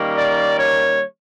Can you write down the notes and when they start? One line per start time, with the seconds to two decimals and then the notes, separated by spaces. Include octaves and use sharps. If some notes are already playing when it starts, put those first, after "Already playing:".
Already playing: D#3 G3 A#3 C#4
0.17 D5
0.59 C#5